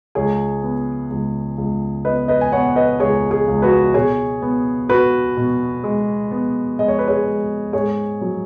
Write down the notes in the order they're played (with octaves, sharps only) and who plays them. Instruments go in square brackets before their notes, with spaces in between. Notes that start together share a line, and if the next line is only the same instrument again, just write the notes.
[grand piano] C#2 G#4 C#5
B3
C#2
C#2
B3 B4 D#5
B4 D#5
G#5
B3 C#5 F#5
B4 D#5
C#2 G#4 C#5
G#4
C#2
F#4 B4
B2 G#4 C#5
B3
B3 F#4 B4
B2
G#3
B3
G#3 D#5
C#5
B4
G#4 C#5
G#3
G#2 G#4 C#5
F#3